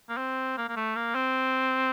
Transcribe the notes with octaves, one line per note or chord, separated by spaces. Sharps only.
A#3
C4
A#3
A#3
A3
A#3
C4